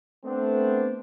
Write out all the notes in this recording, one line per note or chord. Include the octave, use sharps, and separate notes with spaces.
A3 B3 C4 D4